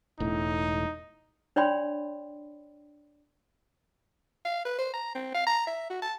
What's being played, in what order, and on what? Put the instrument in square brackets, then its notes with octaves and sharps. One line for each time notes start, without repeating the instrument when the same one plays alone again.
[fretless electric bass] E1 A2 [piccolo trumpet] D#4
[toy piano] D4 C#5 D5 G5 B5 C6
[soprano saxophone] F5
B4
C5
A#5
C4
F5
A#5
E5
F#4
A5